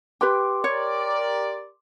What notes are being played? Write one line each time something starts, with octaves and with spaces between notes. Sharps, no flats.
G4 B4 G5 C6 D6
G4 A#4 C#5 D5